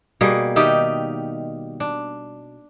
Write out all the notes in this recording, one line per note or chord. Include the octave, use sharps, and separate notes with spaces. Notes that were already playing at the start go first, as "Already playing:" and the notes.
B2 G3 A#3 G#4
D#3 D#4 G4 E5
D4